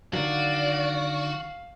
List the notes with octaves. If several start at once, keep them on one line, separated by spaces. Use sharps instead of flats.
D3 D#3 F#3 F#4 D5 F5